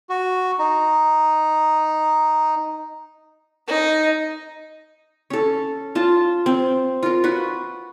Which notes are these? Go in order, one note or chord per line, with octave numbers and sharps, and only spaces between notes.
F#4
D#4
D#4
C#4 A4
F4 A5
C4
F4 A#4
F#4 B4